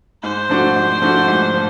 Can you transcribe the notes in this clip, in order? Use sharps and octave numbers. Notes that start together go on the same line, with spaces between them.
G#2 C5
F3 A3 D4 F#4
G#2
F3 A3 D4 F#4
G#2
F3